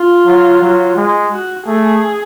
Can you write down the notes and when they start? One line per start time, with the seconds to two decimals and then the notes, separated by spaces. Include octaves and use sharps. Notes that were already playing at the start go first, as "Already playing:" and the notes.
Already playing: F4
0.27 F#3
0.62 F#3
0.97 G#3
1.32 F#4
1.67 A3 G#4